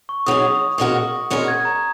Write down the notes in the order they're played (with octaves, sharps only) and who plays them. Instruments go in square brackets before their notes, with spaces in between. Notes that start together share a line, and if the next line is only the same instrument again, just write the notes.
[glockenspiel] C#6
[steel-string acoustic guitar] C#3 F#3 D#4 G#4 [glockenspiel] D#6
[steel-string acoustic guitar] A#2 G#3 C#4 F#4 A#4
A#2 G#3 C#4 F#4 A#4
[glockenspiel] G#6
A#5